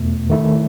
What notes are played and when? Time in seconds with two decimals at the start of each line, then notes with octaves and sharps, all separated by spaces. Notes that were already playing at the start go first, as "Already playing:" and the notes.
Already playing: E2 B2 A3
0.30 D#3 A3 E4